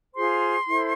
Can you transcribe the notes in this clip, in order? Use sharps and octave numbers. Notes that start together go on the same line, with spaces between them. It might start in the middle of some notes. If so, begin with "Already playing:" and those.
F4 G#4 C5 C6
E4 A4 C5